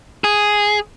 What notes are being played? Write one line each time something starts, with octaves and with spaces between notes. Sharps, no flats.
G#4